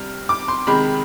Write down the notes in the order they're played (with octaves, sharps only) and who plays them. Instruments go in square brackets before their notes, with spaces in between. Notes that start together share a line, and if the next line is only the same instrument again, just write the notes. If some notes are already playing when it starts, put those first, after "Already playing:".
Already playing: [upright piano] C3 G3 F6
D6
C6
C3 D#3 G#3 B5